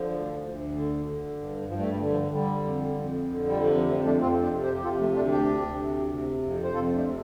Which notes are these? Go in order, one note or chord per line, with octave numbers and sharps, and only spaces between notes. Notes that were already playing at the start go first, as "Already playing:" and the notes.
Already playing: D3 F3
D2
D2
D3
D3
G2
G2 F3
A3
G3
D3
F3
D3 G3
F2
F2
D3
G3
C3 F3
F3
F2 F3 A3
A3 D4
F2 C4 F4
D4 G4
C3
G4 C5
G4
C3 F4 A4
F3 A3
D2 A3 D4
D4 G4
D2
C3
C3
F2
C5
F2 F4 A4
A3 D4
C3